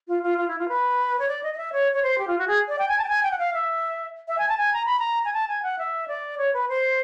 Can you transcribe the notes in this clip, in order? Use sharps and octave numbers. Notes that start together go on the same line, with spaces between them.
F4
F4
F4
E4
F4
B4
C#5
D5
D#5
D#5
E5
C#5
C#5
C5
G4
F4
F#4
G#4
D5
G5
G#5
A5
G5
G#5
G5
F#5
F5
E5
E5
G#5
A5
G#5
A#5
B5
A#5
G#5
A5
G#5
F#5
E5
D5
C#5
B4
C5